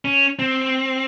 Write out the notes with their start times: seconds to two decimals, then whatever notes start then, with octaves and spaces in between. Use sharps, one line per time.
0.05 C#4
0.39 C4